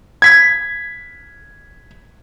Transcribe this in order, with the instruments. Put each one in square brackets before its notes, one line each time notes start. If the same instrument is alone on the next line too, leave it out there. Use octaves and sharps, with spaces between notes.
[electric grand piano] G#6 B6